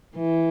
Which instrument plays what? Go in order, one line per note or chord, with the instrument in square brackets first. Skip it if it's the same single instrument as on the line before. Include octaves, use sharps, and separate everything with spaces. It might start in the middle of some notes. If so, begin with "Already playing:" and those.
[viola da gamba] E3